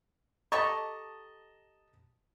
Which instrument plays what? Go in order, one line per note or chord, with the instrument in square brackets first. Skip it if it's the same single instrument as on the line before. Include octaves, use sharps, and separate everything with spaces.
[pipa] G4 A4 C#6 [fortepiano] D#5 A5 A#5